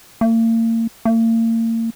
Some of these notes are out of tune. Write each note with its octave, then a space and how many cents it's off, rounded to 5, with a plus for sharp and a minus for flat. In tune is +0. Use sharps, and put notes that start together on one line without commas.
A#3 -40
A#3 -40